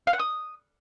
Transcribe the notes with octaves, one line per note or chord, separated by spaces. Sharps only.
F5
F#5
D#6